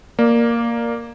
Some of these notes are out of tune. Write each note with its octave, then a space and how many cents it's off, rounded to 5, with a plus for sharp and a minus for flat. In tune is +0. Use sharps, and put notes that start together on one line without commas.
A#3 +0 D5 +10